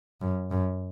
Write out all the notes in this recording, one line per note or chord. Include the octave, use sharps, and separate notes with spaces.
F#2
F#2